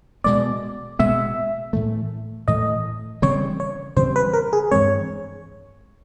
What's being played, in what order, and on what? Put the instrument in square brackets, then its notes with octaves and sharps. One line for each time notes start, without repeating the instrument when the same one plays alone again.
[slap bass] B2 G#3 B3 [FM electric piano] D5
[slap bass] B2 G#3 B3 [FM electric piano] E5
[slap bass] A2 E3 A3
[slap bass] A2 E3 A3 [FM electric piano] D#5
[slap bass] C#3 E3 G3 C4 [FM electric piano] C#5
[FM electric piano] C#5
[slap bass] C#3 E3 G3 C4 [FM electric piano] C5
[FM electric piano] B4
A#4
G#4
[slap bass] G2 E3 G#3 C4 [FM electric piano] C#5